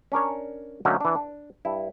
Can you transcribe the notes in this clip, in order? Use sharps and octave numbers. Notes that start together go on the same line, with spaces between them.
C#4 D4 A#4 C#5
D3 F#3 A3 A#3 C#4 D#4
E3 D4
D4
G2 E4